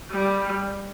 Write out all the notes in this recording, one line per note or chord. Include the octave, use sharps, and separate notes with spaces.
G3